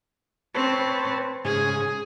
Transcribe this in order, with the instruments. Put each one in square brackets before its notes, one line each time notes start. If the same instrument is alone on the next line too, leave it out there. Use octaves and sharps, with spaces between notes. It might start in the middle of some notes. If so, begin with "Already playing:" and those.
[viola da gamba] C4 [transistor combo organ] B4 C#5 A5
[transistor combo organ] G#2 C#3 G#5 [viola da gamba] G#4